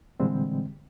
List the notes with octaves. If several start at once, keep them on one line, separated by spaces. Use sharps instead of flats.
A#2 D3 E3 G3 G#3 C4